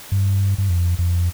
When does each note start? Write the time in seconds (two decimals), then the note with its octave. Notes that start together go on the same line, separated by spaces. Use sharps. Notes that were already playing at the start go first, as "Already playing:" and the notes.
0.12 G2
0.58 G2
0.69 F2
0.99 F2